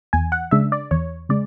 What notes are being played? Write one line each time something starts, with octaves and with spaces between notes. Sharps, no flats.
E2 G#5
F#5
C#3 G#3 D4 E5
D5
E2 C#5
C#3 G#3 D5